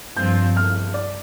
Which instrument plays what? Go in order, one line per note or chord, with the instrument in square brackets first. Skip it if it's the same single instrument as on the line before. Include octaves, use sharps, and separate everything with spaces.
[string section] G2 F3 C4 F4 [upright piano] G6
[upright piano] F6
D5